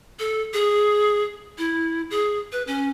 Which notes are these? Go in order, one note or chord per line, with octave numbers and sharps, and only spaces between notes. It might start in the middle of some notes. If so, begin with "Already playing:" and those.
A4
G#4
E4
G#4
B4
C#4